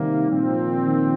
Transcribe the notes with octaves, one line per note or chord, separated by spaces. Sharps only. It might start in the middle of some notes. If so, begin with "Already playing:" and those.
Already playing: C3 D#3 G3 A#3
A#2 F3 C4
D#3